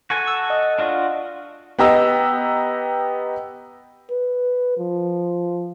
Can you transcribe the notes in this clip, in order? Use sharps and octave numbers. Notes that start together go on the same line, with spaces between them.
F#4 A4 G#5
E6
D#5
D4 F4 F#4
B3 G4 D#5 A#5 E6
B4
F3